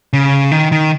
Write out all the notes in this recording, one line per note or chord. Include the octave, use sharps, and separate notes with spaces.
C#3
D#3
D#3